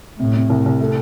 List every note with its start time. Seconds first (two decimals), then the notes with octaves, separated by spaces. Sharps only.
0.19 A2 C3
0.35 C3
0.50 C2
0.66 C2
0.81 A3